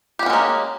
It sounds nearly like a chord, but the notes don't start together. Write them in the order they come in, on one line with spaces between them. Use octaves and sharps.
G4 F#4 C#4 G#3 A#3